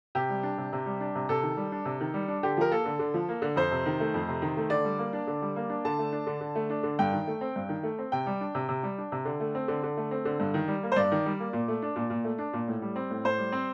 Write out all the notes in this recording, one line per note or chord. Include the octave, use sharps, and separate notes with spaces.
C3 G4
G3
D4
C3
C3
G3
D4
C3
C3 A4
D#3
G3
D4
C3
D#3
G3
D4
D3 G4
F3 A#4
A#3 A4
D3
D3
F3
A#3
D3
F2 C5
C3
D#3
A3
F2
C3
D#3
A3
D3 D5
G3
A#3
D4
D3
G3
A#3
D4
D3 A5
A3
D4
D3
D3
A3
D4
D3
G2 G5
D#3
A3
C4
G2
D#3
A3
C4
C3 G5
G3
D4
C3
C3
G3
D4
C3
D3
A3
C4
D3
D3
A3
C4
D3
G2
D#3
G3
A#3
C5
G2 D5
D#3
G3
A#3
A#2
A3
D4
A#2
A#2
A3
D4
A#2
A2
G3
C4
A2
A2 C5
G3
C4